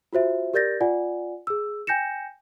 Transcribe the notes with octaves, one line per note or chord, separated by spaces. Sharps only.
F4 F#4 C5 E5
G4 A#4 D5 G6 A6 A#6
F4 D5 F#5 G#5
G#4 E6
G5 G#5 G6 A#6 C#7 E7